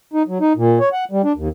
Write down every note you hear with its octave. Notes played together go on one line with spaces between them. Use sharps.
D#4
F#3
D#4
A#2
C#5
F#5
G3
D4
D#2